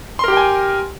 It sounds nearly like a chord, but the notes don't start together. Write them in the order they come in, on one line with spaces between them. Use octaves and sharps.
C6 A#4 G4 G5 G#5